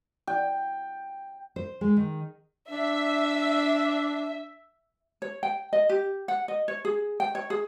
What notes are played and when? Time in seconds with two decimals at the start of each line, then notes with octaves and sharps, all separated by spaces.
0.27 G5
1.56 C5
1.81 G#3
1.97 D#3
2.71 D4 E5
5.22 C#5
5.43 G5
5.73 D#5
5.90 G4
6.28 F#5
6.48 D#5
6.68 C#5
6.85 G#4
7.20 G5
7.35 C#5
7.50 G#4